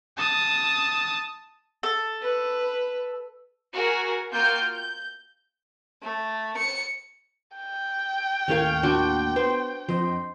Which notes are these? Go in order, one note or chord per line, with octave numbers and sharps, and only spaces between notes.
A5 D#6
A4
B4
F#4 G#4 A#4 G#5
A#3 F4 F#4 G5 F6 G6
G6
A3
C#7
G5
D#2 A2 A#3 C#4 C#5 F5
D4 F#4 C6
B3 C5
F2 C5 D#5